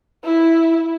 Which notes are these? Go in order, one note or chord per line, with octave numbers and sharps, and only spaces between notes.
E4